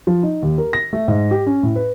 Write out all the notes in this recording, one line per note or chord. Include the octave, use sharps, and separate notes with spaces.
F3
D#4
D#2
A#4
A#6
A3
G#2
G4
C#4
A2
B4